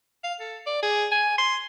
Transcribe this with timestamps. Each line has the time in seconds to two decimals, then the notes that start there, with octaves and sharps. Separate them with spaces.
0.24 F5
0.40 A4
0.66 D5
0.83 G#4
1.12 G#5
1.38 C6